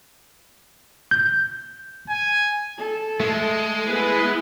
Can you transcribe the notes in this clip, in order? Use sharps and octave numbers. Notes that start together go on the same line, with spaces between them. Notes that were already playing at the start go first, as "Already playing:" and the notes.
G6
G#5
A4
G#3 A3
B3 E4 G#4 B4